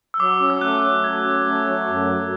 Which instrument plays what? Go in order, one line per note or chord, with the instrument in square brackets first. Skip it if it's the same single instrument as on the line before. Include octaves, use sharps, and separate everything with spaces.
[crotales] E6
[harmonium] F#3 [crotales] D6
[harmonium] C#4
[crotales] E6
[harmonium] A3 [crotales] F#6
[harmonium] F#3
[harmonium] F#3 [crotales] G#6
[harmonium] C#4
A3
F#3
F#2
F#3